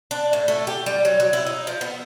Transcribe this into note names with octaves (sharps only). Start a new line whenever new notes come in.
D4
A2
A3
G4
G3
F#3
F#3
E4
D#4
F3
B3